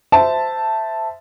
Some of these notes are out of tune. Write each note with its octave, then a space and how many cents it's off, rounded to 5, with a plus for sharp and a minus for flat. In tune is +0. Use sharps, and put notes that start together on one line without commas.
C5 -20 E5 +0 A5 +0